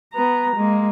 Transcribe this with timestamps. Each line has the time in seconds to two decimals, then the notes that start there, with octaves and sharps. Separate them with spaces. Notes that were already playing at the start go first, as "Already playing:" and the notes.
0.13 B3 A#5
0.56 G#3 A#3